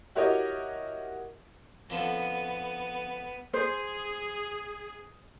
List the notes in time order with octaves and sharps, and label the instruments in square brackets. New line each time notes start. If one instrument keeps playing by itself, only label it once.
[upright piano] E4 F#4 G4 A#4 C#5 D#5
[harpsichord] F2 D3 F3 [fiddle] B3
[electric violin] G#4 [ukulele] C5